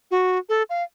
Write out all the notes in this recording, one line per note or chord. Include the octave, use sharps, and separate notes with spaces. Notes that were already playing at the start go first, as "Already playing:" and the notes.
F#4
A4
F5